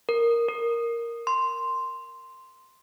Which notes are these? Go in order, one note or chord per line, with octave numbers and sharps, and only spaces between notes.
A#4
A#4
C6